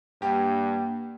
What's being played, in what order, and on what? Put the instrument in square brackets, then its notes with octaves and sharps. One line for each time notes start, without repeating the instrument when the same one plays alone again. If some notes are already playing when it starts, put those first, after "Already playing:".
[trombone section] G2 [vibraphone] A#3 F#5 G5 [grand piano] G4